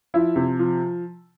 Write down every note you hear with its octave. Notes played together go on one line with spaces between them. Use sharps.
F3 E4
C3
F3